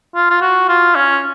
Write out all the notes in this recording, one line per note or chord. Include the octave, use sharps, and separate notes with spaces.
F4
F4
F#4
F4
C#4